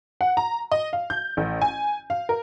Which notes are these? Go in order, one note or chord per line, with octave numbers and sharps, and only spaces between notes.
F#5
A#5
D#5
F5
G6
A1
G#5
F5
A#4